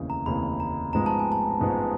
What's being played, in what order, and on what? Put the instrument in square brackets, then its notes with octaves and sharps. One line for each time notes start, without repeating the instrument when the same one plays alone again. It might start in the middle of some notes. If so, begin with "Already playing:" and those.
Already playing: [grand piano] F1 D#2 C#3 E3
[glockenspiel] A#5
[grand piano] F1 D#2 C#3 E3 [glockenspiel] B5
[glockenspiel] A#5
[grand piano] A1 G#2 F3 G#3 B3 [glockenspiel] A#5
[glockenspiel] A5
G#5
A5
[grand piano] A1 G#2 F3 G#3 B3